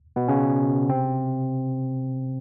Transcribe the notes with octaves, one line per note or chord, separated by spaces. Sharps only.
B2 B3
C#3 C#4
C3 C4